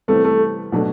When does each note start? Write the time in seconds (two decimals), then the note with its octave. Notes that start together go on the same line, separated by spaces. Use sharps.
0.08 C3 E3 G3 A3 B3
0.24 A3
0.72 B2 F#3 A3 D4